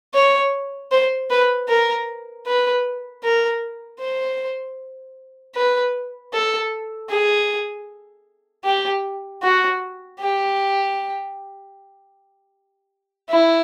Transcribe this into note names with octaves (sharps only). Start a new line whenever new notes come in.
C#5
C5
B4
A#4
B4
A#4
C5
B4
A4
G#4
G4
F#4
G4
E4